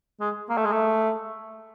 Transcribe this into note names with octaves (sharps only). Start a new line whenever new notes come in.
G#3
A#3
A3
G#3
A3